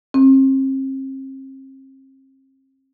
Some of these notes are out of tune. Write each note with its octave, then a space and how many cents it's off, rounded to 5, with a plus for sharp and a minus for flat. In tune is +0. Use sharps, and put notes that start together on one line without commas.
C4 +40